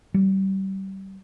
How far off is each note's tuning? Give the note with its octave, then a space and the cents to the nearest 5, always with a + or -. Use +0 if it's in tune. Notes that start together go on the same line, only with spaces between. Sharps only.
G3 -25